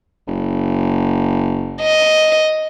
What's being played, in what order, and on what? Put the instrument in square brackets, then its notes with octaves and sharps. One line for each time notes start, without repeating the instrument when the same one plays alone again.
[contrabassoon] F#1
[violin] D#5